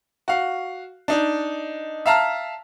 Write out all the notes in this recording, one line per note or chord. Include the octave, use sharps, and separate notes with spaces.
F#4 F5
D4 D#4
E5 F5 A5 A#5 F6